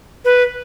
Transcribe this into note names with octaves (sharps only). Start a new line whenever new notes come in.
B4